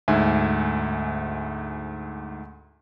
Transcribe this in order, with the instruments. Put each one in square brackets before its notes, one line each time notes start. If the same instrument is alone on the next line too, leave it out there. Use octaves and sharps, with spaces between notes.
[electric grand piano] D2 G#2 E5 G#5